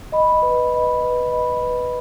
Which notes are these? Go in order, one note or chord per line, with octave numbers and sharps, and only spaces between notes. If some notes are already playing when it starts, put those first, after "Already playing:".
D#5 B5
B4
D#5 B5
B4
D#5 B5
B4